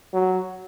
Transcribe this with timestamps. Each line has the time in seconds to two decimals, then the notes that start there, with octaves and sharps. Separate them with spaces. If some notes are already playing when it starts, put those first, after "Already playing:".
0.14 F#3